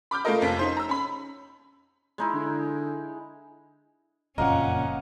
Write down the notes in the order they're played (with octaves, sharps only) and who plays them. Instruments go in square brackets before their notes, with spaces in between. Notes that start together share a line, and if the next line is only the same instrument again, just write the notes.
[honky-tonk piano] B5 D6 F6 G6
A3 A#3 F4 A4 A#4 D#5
F1 F2 B6
C#4 D#4 C5
A#5 E6
C#4 B5
[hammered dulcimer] G#3 D#4 E4
[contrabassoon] D3
[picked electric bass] F#1 F2 A#2 [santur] A#3 [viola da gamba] C#4 [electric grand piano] D#5 F5 F#5